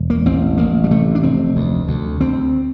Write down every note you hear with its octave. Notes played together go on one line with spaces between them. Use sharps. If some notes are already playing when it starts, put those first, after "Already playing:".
Already playing: E1
A#3
A1 C4
A1 A#3
G3
C3 A3
D4
F1 C4
D2
D2
D2 C4